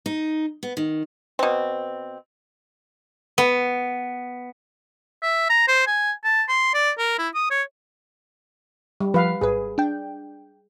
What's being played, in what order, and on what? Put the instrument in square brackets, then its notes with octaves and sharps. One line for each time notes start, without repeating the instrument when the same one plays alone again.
[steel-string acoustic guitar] D#4
B3
D#3
[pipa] B2 C4
[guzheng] B3
[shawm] E5
A#5
C5
G#5
A5
C6
D5
A#4
E4
D#6
C#5
[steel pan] G3
[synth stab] F3 [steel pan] B4 F5
[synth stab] G#1 B4 [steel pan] G#4
[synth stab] D4 G5